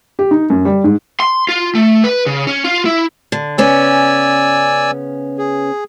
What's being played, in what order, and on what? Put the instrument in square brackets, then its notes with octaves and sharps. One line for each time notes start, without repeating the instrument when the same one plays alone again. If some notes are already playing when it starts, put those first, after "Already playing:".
[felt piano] G4
D#4
F#2
G3
G#2
[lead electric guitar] C6
F4
A3
B4
C#3
C#4
F4
E4
[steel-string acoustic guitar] D3
[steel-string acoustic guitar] C#3 B3 C#4 [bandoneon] D5 G#5 E6
[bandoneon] G#4